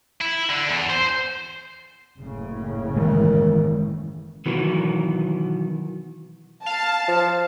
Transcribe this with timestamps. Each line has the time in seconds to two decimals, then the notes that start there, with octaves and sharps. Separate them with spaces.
0.21 E4
0.49 D3
0.69 E2
0.90 C5
2.17 F#1 A2 C#3
2.96 D#3 E3 G#3
4.46 B2 D#3 E3 F#3 B3
6.66 F5 A5
7.08 F3